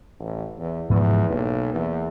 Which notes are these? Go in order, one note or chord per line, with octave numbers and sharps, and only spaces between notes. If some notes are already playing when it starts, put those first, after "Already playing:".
A1
E2
E2 G#2 F3 B3
B1 A#3
E2